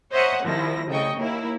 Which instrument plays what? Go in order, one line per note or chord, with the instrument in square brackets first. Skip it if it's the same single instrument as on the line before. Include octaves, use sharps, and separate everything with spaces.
[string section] C5 C#5 D#5 E5 F#5 A#5
C2 D#3 F3 E4 A#6
C2 C#3 A3 D#5 G5 C#6
D#2 A#3 E4 A#4